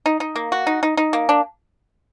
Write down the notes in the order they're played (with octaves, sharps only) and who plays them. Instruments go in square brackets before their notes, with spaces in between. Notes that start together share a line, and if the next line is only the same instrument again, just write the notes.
[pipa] D#4
D#4
A#3
F#4
D#4
D#4
D#4
A#3
D4